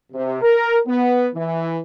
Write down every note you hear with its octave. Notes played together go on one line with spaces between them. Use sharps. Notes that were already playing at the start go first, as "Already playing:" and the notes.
C3
A#4
B3
E3